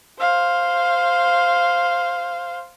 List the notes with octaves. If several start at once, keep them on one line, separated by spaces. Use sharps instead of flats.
C5 F5